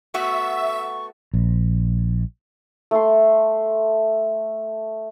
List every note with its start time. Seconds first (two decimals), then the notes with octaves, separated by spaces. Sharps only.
0.14 A3 B3 F#4 E5 C#6
1.34 A#1
2.91 A3 C6